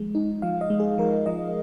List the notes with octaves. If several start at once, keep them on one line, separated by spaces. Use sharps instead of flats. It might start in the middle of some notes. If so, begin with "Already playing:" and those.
Already playing: F3 G#3
D#4
F3 F5
D#5
G#3
G#4
F3 A#4
F3 D#5